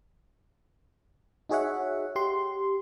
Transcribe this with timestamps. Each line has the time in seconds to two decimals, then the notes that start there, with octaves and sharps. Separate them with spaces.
1.49 D#4 F#4 G#4 C#5 E5 F#5
2.16 G4 C6